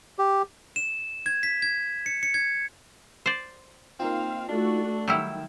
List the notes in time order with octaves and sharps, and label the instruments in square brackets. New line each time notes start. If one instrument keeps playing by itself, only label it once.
[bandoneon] G4
[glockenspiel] E7
G#6
B6
G#6
C#7
C#7
G#6
[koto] C5 D5
[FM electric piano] A#3 D#4 F4 [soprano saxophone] C4 [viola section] F5
[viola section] A3 F#4 A4 [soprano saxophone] D4
[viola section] D#3 [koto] F#3 G3 E4 [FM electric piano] G5 E6